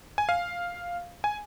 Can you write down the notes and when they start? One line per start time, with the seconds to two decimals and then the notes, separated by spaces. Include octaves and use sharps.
0.18 G#5
0.29 F5
1.24 G#5